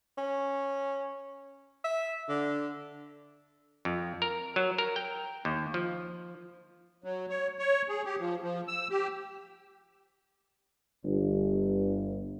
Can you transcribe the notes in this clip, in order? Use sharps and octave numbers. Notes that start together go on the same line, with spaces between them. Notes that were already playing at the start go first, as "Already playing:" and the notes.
C#4
E5
D3
F2
A#4
F#3
A#4
G5
D#2
F3
F#3
C#5
C#5
G#4
G4
F3
F3
E6
G4
G1